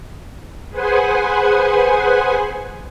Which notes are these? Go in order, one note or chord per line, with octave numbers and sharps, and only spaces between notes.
G#4 B4 C5 F#5 G#5